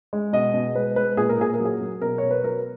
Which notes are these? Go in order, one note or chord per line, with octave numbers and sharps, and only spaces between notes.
G#3
B2 D#5
B2
G#3 B4
G#3 B4
A#2 G#4
A#4
A#2 G#4
A#4
F#3
G#4
F#3
B2 A#4
B2 C#5
B4
F#3 A#4